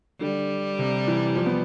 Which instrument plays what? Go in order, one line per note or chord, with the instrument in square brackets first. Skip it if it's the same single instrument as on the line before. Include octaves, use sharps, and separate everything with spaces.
[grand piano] D3 [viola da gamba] G3
[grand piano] C3
E3
F3
B3